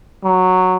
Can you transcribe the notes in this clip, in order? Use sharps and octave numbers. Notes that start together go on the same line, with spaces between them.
F#3